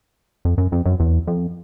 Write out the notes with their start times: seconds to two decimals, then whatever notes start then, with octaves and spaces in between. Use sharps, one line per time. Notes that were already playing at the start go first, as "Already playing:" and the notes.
0.45 F2
0.58 F#2
0.72 F2
0.86 F#2
1.00 E2
1.27 F2